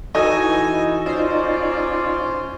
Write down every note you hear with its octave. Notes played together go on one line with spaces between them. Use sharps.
E3 D#4 F#4 A4 D#5 G#5
C#4 D#4 F4 C5 D5